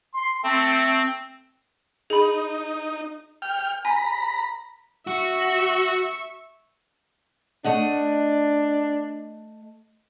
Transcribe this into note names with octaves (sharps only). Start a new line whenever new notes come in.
C6
A3 C4
D#4 G#4 B5
G5 F6
G#5 A#5 B5
F#4 E5 C#6
A3 D4 D#5 F#5